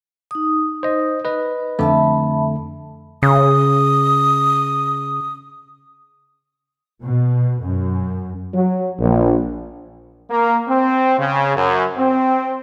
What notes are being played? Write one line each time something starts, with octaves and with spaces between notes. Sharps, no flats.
D#4 D#6
C5 D#5
B4 D#5
F2 D3 A3 E5 A5 B5
C#3 D#6
B2
F#2
F#3
A#1
A#3
C4
C#3
F#2
C4